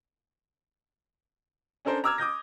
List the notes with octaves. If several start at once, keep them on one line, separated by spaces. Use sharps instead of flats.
C#4 D4 A4 A#4 C5
A#5 D6 E6 F6 G#6
D6 D#6 G6 A#6